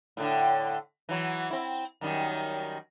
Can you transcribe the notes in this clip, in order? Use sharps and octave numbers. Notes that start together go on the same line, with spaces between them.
A2 D3
E3 F#3
C4 E4
F#2 D#3 G3